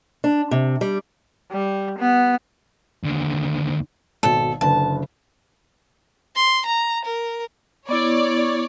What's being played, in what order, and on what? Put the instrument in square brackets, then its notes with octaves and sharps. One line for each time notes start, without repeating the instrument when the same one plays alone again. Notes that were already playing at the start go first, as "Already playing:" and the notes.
[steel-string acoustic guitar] D4
C3
G3
[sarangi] G3
B3
[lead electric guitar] D#2 D3
[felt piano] G#1 B2 [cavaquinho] A4
[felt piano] F#1 D3 B4 [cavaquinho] A5
[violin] C6
A#5
A#4
[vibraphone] B3 E4 [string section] C#5 D5